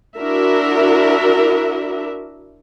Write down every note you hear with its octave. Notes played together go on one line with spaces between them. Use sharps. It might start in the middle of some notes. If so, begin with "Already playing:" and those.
D4 E4 F#4 A#4 E5